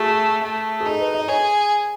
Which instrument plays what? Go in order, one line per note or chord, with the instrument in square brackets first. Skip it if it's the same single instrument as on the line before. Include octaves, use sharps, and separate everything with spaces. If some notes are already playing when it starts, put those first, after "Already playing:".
Already playing: [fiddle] A3 [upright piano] F#4 G#4
[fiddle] A3
[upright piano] G#4
[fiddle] D#4 [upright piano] A4
[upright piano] B4
D#5
[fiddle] G#4 [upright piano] C#5